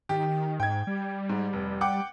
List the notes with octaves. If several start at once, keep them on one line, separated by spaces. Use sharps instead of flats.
D#3 G4
G#2 G5 G#6
G3
G#2
F1
F#5 G5 D6